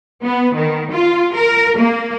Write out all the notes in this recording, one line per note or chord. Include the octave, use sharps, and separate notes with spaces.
B3
D#3
F4
A#4
A#3